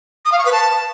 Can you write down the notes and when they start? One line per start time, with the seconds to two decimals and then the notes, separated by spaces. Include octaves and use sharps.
0.25 D#6
0.32 F5
0.39 C#6
0.45 B4
0.52 A5